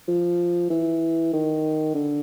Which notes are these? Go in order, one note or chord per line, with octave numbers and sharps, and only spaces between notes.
F3
E3
D#3
D3